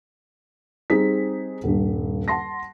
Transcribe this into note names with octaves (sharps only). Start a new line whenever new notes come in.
G3 C4 D#4 G#4 B6
D#1 G2
F#5 A5 C6 A#6